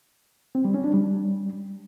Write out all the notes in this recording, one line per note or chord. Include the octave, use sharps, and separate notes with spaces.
C4
G3
C#4
D4
G3